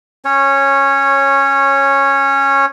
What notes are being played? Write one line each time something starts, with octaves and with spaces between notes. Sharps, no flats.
C#4 C#5